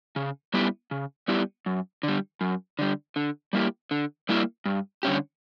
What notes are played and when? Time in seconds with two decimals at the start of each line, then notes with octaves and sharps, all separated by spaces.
0.16 C#3
0.54 G3 B3 E4 G4
0.91 C#3
1.28 G3 B3 E4 G4
1.66 F#2
2.03 D3 G3
2.41 F#2
2.79 D3 G3
3.16 D3
3.53 G3 A#3 E4 G4
3.91 D3
4.29 G3 A#3 E4 G4
4.65 G2
5.03 D3 G3 C#4 G4